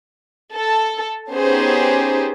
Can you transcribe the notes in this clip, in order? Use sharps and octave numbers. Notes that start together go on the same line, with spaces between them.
A4
B3 C#4 D#4 G4 G#4 C5